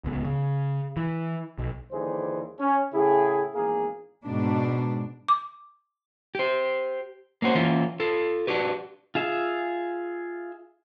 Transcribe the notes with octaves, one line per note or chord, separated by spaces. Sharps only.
D1 C#2 B3
C#3
E3
B1
D#2 D3 E3 G3 G#4 C5
C#4
A2 C#3 E4 G#4
G#1 E2 A#3 G#4
G#2 B2 D4
D6
G4 C5
A#3 C#4 F#4 C5
E3 A#3 C#4 F4
F4 A4
D4 F#4 G4 B4
F4 G#4 E5